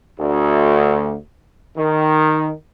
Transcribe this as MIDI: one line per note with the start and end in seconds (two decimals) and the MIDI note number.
0.19 1.15 38
1.77 2.50 51